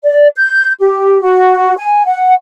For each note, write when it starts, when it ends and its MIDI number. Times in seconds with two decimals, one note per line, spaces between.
0.03 0.27 74
0.37 0.72 91
0.80 1.21 67
1.21 1.75 66
1.77 2.02 80
2.06 2.32 78